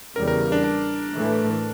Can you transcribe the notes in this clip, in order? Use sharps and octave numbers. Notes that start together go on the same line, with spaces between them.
E2 C#3 G3 A#4
A#4
D4
D4
A2 E3 A3